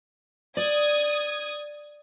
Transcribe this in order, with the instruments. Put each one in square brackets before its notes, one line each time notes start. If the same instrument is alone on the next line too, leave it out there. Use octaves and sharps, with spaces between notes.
[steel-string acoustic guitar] D5 [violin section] D#6 G#6